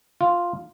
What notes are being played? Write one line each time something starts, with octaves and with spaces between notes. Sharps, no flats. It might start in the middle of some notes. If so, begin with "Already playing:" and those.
F4